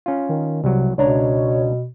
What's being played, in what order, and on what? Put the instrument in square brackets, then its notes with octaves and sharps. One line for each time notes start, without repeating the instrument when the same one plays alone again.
[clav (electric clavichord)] C#4 F4
[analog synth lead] D#3
[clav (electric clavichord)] C2 F#3 [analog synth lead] C3
[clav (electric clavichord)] C#2 D4 A#5 [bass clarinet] B2 [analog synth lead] C#5